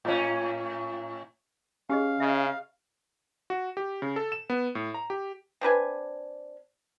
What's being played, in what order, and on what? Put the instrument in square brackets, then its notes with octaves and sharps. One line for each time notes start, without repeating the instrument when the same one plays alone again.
[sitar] A2 C#4
[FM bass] C#4 [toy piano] G4 G#4 D#5 [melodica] F5
[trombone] C#3 [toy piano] D#5 E5
[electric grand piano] F#4
G4
C#3
A4
E7
B3
A2
A#5
G4
[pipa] C4 D4 B4 G#5